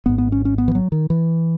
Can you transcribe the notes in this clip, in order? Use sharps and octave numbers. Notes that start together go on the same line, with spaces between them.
G#1 G#2 B3
B3
C#4
C#4
B3
E3
F#3
D#3
E3